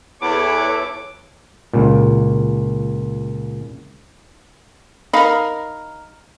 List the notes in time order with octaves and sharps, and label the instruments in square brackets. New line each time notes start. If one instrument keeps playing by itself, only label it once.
[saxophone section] E2 [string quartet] E4 A4 C#5 [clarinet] D6
[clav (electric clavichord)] C#2 A#2
[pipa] D#4 A#4 [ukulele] F5 B5